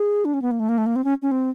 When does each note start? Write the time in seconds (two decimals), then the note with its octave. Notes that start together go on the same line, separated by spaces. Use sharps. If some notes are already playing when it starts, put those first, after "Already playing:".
Already playing: G#4
0.25 D4
0.34 C#4
0.42 B3
0.51 A#3
0.60 A3
0.69 A#3
0.78 A3
0.86 A#3
0.96 C4
1.04 C#4
1.22 C#4
1.31 C4